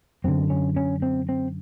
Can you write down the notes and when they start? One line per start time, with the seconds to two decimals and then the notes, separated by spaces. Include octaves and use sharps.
0.24 F#2 D3 C4
0.50 C#4
0.76 C#4
1.02 C4
1.29 C4